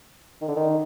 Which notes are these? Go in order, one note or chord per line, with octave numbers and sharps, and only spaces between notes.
D#3
D3
D#3